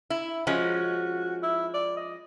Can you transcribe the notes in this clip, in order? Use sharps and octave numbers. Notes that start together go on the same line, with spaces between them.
E4
F3 G#3 C#4 F#4
E4
D5
D#5